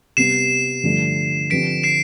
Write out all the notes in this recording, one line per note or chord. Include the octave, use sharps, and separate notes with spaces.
C3 G3 B3 C7 E7
G2 D3 F3 A3
D3 F3 C4 G4 B4 B6 D7
C7 E7